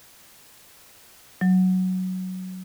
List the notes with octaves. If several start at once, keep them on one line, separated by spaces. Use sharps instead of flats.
F#3